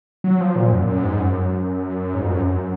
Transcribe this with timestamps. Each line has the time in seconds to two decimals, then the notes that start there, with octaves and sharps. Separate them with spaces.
0.24 F#3
0.40 F3
0.56 A#2
0.72 F#2
0.87 F#2
1.04 G#2
1.19 F#2
2.14 G#2
2.23 F2
2.30 F#2
2.45 F#2